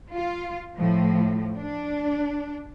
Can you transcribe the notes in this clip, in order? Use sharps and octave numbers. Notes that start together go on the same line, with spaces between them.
F4
A2 F3
D4